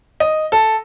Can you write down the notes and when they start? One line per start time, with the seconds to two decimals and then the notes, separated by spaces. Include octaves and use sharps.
0.20 D#5
0.52 A4